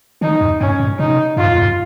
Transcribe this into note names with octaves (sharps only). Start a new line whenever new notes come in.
D#3 D#4
F2
G2 C#4
G#2
C3 D#4
G2 F4
F2
G2